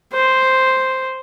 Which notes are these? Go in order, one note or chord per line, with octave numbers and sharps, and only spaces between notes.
C5